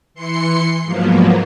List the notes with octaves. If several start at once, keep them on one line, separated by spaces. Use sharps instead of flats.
E3 C6 C7 C#7
G#2 F3 F#3 A#3 B3